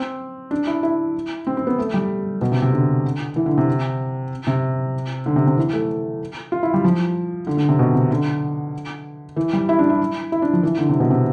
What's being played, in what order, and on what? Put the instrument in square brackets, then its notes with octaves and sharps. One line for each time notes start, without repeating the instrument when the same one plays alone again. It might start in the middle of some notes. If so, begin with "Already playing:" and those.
Already playing: [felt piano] C4
D4
E4
E4
C4
C4
B3
A3
G3
B2
C3
C3
D3
E3
D3
C3
C3
D3
C3
C3
E3
A3
F4
E4
G3
F3
D3
D3
C3
B2
C3
D3
E3
G3
E4
D4
E4
E4
D4
F3
E3
D3
C3
B2
C3